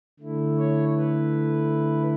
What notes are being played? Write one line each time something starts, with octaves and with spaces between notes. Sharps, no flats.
D3 A3 E4
C#5
B4